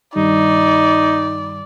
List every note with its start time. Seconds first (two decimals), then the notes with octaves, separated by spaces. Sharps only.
0.16 G2 D#3 G3 D#4 D5